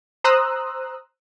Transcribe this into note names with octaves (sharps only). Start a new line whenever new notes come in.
C5 A#5 C6 D#6 E6 F#6